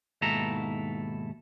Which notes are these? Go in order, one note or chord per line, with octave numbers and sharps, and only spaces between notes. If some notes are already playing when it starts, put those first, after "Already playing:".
D#2 G#2 B2 E4 A4 A#5